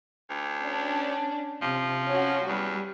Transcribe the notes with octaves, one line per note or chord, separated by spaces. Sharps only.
D2
C#4 D4
C3 F3
C#4 F#4
E2 G3